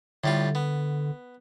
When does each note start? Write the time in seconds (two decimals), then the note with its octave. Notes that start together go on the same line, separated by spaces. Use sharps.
0.24 A2 D3 G3 F4
0.55 B3